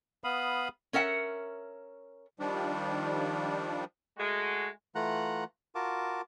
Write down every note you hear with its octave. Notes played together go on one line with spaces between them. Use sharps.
B3 F5 B5 D#6
C#4 A#4 E5 F#5
D#3 F3 G3 D4
G#3 A3 F#4
E3 A3 F4 F#5 A#5 F#6
F4 F#4 A#4 A5 D6